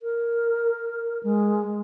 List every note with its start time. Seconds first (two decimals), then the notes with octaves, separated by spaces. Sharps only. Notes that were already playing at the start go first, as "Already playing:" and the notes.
0.02 A#4
1.23 G#3